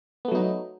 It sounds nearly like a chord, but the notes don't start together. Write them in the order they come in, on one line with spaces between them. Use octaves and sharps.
B3 A3 F#3 D#4